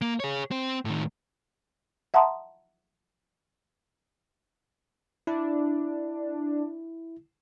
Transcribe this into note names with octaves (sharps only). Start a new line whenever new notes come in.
A#3
G#4 C#5
C4 C5
A2 D#3
E5 F#5 A5 A#5 C6 D#6
D4 E4